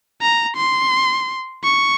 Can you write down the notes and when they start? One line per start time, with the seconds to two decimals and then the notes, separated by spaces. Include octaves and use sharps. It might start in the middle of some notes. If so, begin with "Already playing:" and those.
0.22 A#5
0.57 C6
1.64 C#6